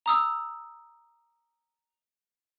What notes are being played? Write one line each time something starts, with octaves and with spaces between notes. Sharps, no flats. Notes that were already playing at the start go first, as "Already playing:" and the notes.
A#5 D#6 E6